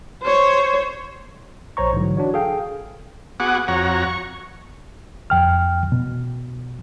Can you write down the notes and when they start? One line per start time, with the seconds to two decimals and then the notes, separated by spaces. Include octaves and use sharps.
0.23 C5 C#5
1.77 A#1 C5 C#5 A#5 C#6
1.93 G#2 D3 E3 F#3
2.17 D4 F#4 C#5
2.34 G#4 A4 F5 G5
3.40 B3 F#4 G#4 F#5 D6
3.68 F2 F#4 C#5 A#5
4.04 C#6
5.30 F2 G5 F6
5.92 B2